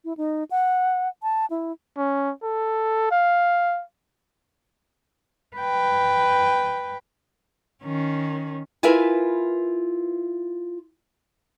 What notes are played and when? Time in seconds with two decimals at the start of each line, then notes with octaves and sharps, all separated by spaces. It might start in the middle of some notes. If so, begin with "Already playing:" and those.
0.05 E4
0.17 D#4
0.51 F#5
1.23 A5
1.50 E4
1.97 C#4
2.43 A4
3.11 F5
5.57 B4 G5
7.84 D#3 C#4
8.83 E4 F4 A#4 B4 E5 G#5